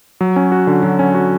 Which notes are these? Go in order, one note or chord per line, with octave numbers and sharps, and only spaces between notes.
F#3
C#4
F#4
D3
F#3
C#4
F#4